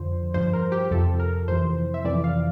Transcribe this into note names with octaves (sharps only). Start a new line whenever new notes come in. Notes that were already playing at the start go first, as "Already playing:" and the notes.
Already playing: F2 D3 F3 C5
G2 F3 C5
A#4
G4
F2 C3 F3 A4
A#4
F2 C3 E3 C5
E5
F2 C3 E3 D5
F5